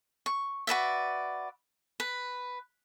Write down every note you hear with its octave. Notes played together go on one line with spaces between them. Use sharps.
C#6
F#4 B4 D5 E5
B4